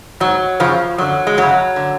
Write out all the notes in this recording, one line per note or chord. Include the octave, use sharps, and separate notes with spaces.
G#2 F#3
F#2 C#3 F3
F#2 D3 F#3
G#3
F#2 C#3 F#3
D3